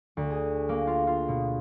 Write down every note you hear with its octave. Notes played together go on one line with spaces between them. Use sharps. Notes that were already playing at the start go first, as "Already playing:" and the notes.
D2
G#4
A#3
F4
F4
B2